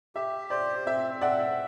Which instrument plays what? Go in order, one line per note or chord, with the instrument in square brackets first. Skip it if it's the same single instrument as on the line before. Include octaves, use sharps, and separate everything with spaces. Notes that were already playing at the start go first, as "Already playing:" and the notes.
[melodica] G4 [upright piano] E5
[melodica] C5 [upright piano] D5
[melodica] C4 [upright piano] E5
[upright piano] D5 F#5 [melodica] E5